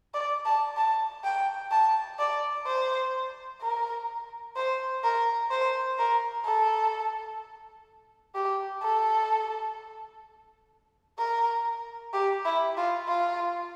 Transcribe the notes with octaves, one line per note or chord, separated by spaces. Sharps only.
D5
A5
A5
G5
A5
D5
C5
A#4
C5
A#4
C5
A#4
A4
G4
A4
A#4
G4
E4
F4
F4